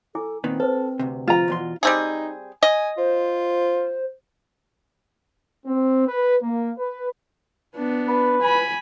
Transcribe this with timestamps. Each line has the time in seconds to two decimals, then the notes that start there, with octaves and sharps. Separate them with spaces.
0.15 E4 A4 G#5 D6
0.44 A#2 D#3 B3 C4
0.60 A4 B4 C5
0.99 D2 C3
1.28 F3 F4 A#5
1.48 E2 B2 C6
1.83 G3 C4 D#4 G#4
2.63 D#5 G#5
2.97 F4 C5
5.66 C4
6.08 B4
6.42 A#3
6.79 B4
7.76 B3 D4
8.08 B4
8.42 G#5 B5